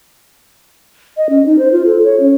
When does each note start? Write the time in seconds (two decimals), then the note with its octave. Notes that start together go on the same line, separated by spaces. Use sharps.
1.17 D#5
1.29 C#4
1.46 D#4
1.58 C5
1.72 F4
1.86 A4
2.04 C#5
2.20 C#4